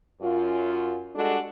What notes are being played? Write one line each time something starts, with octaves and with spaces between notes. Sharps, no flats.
F#2 F4
G3 G#3 D4 F#4 G#4 A4